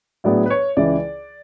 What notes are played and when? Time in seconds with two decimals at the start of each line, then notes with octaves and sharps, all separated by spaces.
0.24 A2 F#3 B3 D4 G#4 D5
0.46 B4
0.50 C#5
0.77 C#2 C#3 E3 D5